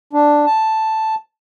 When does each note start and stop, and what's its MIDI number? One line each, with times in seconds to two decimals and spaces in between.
0.13 0.46 62
0.46 1.15 81